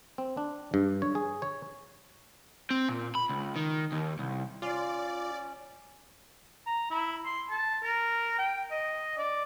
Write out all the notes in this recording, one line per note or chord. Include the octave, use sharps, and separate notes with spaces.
C4
D4
G2
C#5
G#4
C#5
C4
A#2
B5
C#2
D#3
D#2
C2
C#4 F4 D5
A#5
E4
C6
A5
A#4
G5
D#5
D5